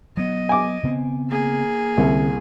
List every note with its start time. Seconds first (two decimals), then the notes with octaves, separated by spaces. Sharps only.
0.17 F#3 B3 D#5
0.49 G#5 D6
0.83 C#3 B3 C4
1.28 A#3 G#4
1.98 C2 D3 C4 C#4